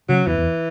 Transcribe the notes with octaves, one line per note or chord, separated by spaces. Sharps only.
C#3 F#3
E2 E3
E2